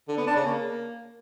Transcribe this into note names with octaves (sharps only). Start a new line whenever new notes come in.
D3
B3
D4
C#3
A#3